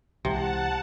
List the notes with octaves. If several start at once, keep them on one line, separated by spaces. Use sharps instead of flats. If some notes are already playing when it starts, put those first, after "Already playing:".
C2 C3 E3 G#3 F#5 A5